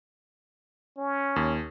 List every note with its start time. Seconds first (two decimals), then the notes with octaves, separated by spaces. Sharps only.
0.98 C#4
1.36 D#2